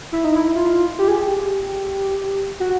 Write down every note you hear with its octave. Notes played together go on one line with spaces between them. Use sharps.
E4
D#4
E4
F4
G4
G#4
G4
F#4